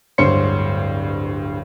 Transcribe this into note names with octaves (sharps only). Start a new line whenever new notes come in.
D1 G2 C5 C#5 C6 C#7